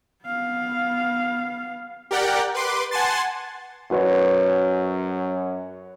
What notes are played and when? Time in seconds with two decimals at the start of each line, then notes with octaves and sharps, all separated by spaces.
0.24 B3 F5
2.11 G4 A#4 D5 F#5 G5
2.54 B4 C6 D6
2.91 F#5 G#5 A5 C6 A6
3.91 F#2 F#4 B4 C#5